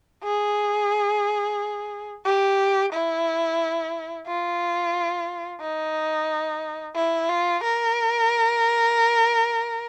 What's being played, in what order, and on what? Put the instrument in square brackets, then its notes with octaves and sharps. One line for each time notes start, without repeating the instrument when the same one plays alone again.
[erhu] G#4
G4
E4
F4
D#4
E4
F4
A#4